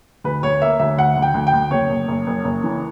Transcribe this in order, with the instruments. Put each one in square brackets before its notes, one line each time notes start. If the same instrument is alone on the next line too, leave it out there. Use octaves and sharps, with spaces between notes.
[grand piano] D2 B4
D2 C#5
A#3 E5
D2 E5
D2 F#5
D2
G5
D2
G5
D2
F#1 C#5
F#1
F#1
F#1
F#1
E3